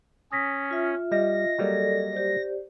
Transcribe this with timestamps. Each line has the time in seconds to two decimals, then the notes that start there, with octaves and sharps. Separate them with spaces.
0.32 C#4 D#6 A#6 B6
0.71 F4 E5
1.11 G3 D#5 A#6
1.58 F#3 G3 A#3 G#4 A4 D5
2.13 G4 C5 D5